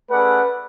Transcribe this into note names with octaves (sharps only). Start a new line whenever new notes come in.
A3 C#4 G#4 B4 D5 F#5